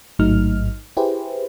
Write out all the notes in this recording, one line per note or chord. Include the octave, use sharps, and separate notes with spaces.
A1 G#2 F#3 A3 D#4 F6
E4 G4 G#4 B4 C5